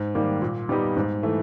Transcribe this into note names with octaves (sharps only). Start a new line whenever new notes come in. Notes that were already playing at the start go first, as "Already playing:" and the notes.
Already playing: G#2
D#3 G3 A#3
A#2
G3 B3 D#4 G4
G#2
E3 A3